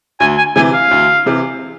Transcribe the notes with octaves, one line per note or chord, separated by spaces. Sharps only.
D2 G#5
G#5
C3 E3 G#5
F5
D2
C3 E3